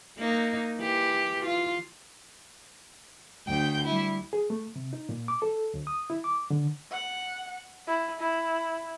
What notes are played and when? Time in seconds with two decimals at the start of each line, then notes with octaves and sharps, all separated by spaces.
0.18 A#3 D#4
0.78 E3 G4
1.46 F4
3.47 D2 G5 G6
3.85 G3 E4
4.33 G#4
4.50 A3
4.76 C3
4.93 D#4
5.09 A#2
5.28 D6
5.42 A4
5.74 D2
5.87 D#6
6.10 E4
6.24 D6
6.50 D3
6.91 F#5
7.87 E4
8.20 E4